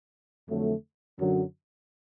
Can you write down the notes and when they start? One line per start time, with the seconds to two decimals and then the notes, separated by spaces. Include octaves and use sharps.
0.49 F2 D3 F#3 A3
1.19 F#2 D3 F#3